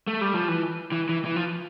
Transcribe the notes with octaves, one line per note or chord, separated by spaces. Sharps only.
A3
G3
F3
E3
E3
E3
E3
F3